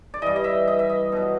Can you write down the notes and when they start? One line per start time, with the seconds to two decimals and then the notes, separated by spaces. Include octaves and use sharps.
0.14 D5
0.22 G2 E3 D#5
0.36 D#5
0.44 E5
0.68 D#5
0.79 E5
0.90 D#5
1.12 B2 F#3